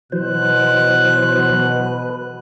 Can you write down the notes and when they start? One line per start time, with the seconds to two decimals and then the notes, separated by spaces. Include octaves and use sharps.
0.12 B2 E3 F#3 C5 F#6
1.56 B4